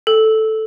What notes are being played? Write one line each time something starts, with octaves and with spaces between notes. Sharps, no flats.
A4